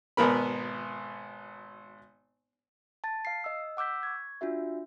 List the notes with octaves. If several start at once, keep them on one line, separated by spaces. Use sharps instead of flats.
G#1 B2 B3 A#4 B5
A5 A6
F5 C7
D#5 E6
F#5 D6 E6 G6 B6
C#6 G#6
D4 F4 F#4 E5